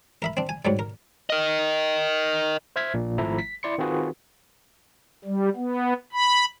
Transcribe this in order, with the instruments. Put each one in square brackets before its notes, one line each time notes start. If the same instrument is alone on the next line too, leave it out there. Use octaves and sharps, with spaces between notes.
[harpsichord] A#4 E5 B5
C4 D4
G#5
G#2 F#3 G3
A#4
[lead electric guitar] A#4 D#5
[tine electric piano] C5 E5 F6 G#6 B6
A#1 A#2
G#1 F3 A3 E4 E5 A#5
B6
E4 D5 C6 C#7
D#3 C4 F4 F#4 G#4 B4
[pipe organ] G3
B3
B5